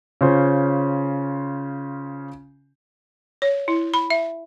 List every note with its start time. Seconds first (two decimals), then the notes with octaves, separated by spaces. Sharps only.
0.21 C#3 C#4 F4 C5
3.42 C#5
3.68 E4
3.94 B5
4.10 E5